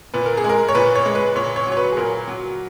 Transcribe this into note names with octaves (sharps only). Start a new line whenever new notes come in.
A#2 B4
A#4
G#4
G#3
A#4
C#5
A#2 B4
C#5
G#3
B4
A#2 C#5
C#5
F#3
C#5
B4
G#4
A#2 A#4
F#3